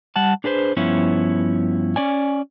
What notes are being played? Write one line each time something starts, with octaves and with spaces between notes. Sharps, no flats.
G3 F#5 A5
D4 G#4 B4 C5
G2 F3 B3 C#4 E4
C#4 D5 G#5